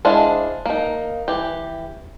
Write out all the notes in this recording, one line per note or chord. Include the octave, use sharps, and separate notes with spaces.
G#3 D4 E4 C5 F5
A#3 D#4
E3 G4